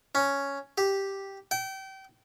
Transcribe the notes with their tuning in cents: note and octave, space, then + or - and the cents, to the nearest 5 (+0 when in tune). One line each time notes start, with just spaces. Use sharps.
C#4 +5
G4 +0
G5 -30